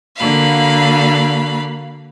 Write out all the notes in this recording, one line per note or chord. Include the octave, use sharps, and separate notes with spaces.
D3 A#3 F#4 F5 B5